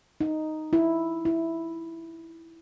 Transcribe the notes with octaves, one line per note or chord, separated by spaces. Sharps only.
D#4
E4
E4